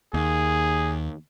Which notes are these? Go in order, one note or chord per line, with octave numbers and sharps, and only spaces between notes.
D#2 G#4